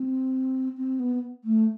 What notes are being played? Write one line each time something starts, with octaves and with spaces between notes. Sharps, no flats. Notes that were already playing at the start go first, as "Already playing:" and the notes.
Already playing: C4
C4
B3
A3